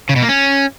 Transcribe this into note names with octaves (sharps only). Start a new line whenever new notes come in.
C#3
B2
A#3
C#4